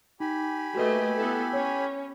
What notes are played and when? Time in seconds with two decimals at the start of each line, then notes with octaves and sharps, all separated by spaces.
0.20 D#4 G4 G#5 B5
0.75 A3 A#3 F#4 B4 D#5
1.15 B3 E4 A4
1.53 C#4 C#5